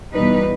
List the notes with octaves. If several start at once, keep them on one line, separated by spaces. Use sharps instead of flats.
E2 B2 G3 D#4 B4